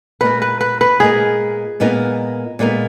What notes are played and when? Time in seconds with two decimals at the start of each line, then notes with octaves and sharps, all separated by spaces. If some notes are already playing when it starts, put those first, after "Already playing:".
0.21 A#2 G#3 B3 D#4 A#4 B4
0.42 B4
0.61 B4
0.81 B4
1.00 A#2 G#3 B3 D#4 G#4 A#4
1.80 A#2 G#3 B3 D#4 A#4
2.59 A#2 G#3 B3 D#4 A#4